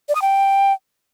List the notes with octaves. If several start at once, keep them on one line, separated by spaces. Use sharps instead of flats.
D5
D#6
G5